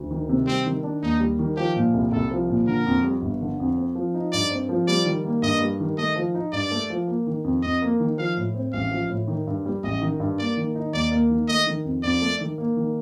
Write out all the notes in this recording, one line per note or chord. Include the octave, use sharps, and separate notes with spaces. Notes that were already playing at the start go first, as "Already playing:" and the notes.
Already playing: D2
D#3
C3
G3 C4
D#3
D4
D#2 D#4
G3
D#3
F3 G4
A#2
C2
C2 A4
F3
A#2
D3 A#4
F2
G3
G1
D3
F2
C4
F3
D#4
G2 D5
C4
F3
G3 D5
D#3
A#3
G2 D#5
G3
D#3
A3 D#5
F3
D#4
G2 D5
A3
F3
A#3
D#3
F2
F2 D#5
A#3
D#3
F3 F5
A2
C4
A1 F5
F3
A2
D#3
G2
G3
A1 D#5
D#3
G2
A#3 D5
D#3
D#4
D#2 D5
A#3
D#3
A3 D#5
D#3
F2
F2 D5
A3
D#3
A#3
D#3